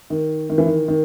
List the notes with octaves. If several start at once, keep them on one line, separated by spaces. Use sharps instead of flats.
D#3
D#3
E3
D#3
D#3